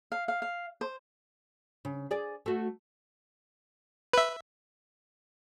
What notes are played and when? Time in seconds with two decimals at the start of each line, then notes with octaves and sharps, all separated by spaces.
0.12 F5
0.28 F5
0.42 F5
0.81 C5
1.85 C#3
2.11 G#4 D5
2.46 A3 F#4
4.13 B4 E5